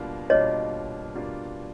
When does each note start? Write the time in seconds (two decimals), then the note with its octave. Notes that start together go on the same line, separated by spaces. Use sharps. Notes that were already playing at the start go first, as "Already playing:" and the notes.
Already playing: B2 G3 A#3 D4 F4
0.30 B2 G3 A#3 D4 F4 C#5 D#5
1.14 B2 G3 A#3 D4 F4